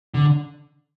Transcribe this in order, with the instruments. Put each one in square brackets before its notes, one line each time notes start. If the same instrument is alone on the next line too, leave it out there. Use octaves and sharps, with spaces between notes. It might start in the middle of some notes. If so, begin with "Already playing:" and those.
[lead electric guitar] D3